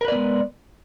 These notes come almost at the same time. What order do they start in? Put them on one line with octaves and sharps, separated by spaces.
A#4 B4 D5 B3 G#3